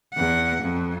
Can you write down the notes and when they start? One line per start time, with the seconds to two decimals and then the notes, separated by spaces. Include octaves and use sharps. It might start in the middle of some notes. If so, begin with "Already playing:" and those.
0.14 E2 F#5
0.63 F2